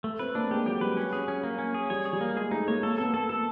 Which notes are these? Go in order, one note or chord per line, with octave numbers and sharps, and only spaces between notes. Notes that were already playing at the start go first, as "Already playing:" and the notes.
A3
C4 B4
A#3 D4
G#3 G4
F#3 G4
G3 B4
F#3 C#4
G#4
C#4
A#3
C#4
G#4
G3 C#5
G#4
G3
A#3
G#3 G#4
A3 D#4
A#3 C#5
A#3 A4
B3 A4
A#3 A4
A3 A4